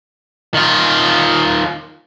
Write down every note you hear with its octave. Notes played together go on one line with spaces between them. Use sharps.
D#3 F4